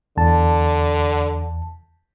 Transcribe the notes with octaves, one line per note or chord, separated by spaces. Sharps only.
E2 D3 A5